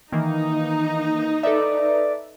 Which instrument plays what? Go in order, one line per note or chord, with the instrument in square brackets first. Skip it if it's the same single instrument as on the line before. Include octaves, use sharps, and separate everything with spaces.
[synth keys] D#3 E3 A#3 [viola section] D#4
[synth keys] A4 B4 E5 [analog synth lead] D5